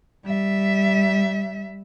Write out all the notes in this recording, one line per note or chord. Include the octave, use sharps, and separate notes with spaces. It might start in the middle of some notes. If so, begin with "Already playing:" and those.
G3 E5